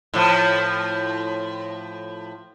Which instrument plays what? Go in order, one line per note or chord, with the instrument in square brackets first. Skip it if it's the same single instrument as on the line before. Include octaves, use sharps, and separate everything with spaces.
[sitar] A2 F3